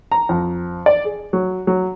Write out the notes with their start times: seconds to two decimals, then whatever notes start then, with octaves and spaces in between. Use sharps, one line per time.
0.12 A#5
0.29 F2
0.86 D5
1.05 G#4
1.33 F#3
1.67 F#3